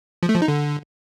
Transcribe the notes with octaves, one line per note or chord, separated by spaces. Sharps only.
F3
A3
F3
D#4
D3